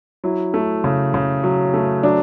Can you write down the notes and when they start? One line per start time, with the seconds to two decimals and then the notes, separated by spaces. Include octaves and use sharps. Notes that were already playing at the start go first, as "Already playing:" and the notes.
0.24 F#3 E4
0.54 A3
0.84 C#3
1.14 C#3
1.44 F#3
1.74 A3
2.03 F#3 D4